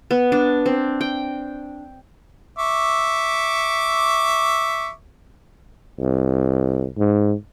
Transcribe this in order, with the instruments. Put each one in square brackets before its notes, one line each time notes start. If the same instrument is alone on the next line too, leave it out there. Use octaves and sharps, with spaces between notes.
[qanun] B3
D4
C4
G5
[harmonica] E5 C#6 D6
[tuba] C2
G#2